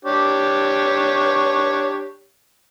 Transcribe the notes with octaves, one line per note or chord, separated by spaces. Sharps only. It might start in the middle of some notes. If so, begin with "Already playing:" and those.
D4 G4 C#5